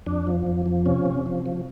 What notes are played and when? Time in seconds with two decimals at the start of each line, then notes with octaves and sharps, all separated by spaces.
0.06 F2 D4
0.27 F3
0.47 F2
0.66 F3
0.86 C3 C#4
1.06 C3
1.26 F3
1.46 F3